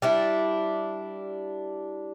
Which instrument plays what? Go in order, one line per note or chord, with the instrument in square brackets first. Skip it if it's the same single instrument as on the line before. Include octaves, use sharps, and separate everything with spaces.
[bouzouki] G3 D4 E4